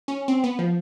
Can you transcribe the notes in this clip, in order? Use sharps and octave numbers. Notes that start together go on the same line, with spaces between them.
C#4
C4
B3
F3